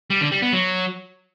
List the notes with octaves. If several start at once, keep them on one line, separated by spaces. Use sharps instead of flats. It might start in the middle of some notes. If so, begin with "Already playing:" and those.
G3
D3
G3
B3
F#3